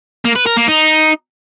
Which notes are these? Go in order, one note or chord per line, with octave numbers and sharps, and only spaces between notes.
A#3
B4
A#4
A#3
D#4